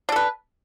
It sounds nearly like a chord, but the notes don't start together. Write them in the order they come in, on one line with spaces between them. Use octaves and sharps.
D4 A4 B4